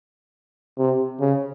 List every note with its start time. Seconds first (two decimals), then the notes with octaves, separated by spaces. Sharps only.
0.78 C3
1.20 C#3